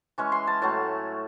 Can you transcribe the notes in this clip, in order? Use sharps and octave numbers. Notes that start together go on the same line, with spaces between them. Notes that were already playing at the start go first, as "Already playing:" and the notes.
E3 G#3 C#4 C#6
C6
A5
A2 F#3 A3 A5